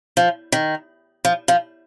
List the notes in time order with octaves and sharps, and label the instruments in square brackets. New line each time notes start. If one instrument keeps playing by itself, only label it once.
[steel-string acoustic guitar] F3
D#3
F3
F3